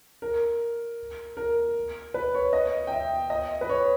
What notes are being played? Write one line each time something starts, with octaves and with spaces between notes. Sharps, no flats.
A#4
A#4
B4
C#5
D#5
G5
E5
D#5
B4
C#5